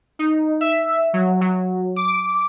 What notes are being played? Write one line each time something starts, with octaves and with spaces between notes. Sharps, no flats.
D#4
E5
F#3
F#3
D6